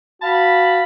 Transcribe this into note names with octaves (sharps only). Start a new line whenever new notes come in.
F#4 F5 A5 B5